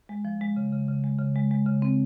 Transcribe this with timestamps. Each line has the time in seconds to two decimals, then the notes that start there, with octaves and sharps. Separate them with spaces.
0.09 G#3
0.25 F3
0.41 G#3
0.56 C#3
0.73 C#3
0.88 C#3
1.04 G#3
1.19 C#3
1.36 G#3
1.51 G#3
1.66 C#3
1.82 C4